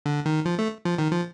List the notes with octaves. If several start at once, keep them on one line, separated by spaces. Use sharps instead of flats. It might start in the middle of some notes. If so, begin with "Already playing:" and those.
D3
D#3
F3
A3
F3
D#3
F3